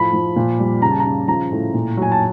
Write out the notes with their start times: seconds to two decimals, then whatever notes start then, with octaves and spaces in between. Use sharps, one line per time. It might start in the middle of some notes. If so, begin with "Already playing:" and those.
Already playing: A2 F3 B5
0.13 F3
0.36 A#2
0.59 G3
0.82 C#3 A#5
0.91 A5
0.99 A#5
1.06 C#3
1.28 F3 A#5
1.52 A2
1.74 A#2
1.97 F#3 G#5
2.11 A5